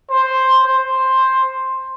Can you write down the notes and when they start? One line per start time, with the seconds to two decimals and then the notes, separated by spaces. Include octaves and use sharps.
0.10 C5
0.64 C5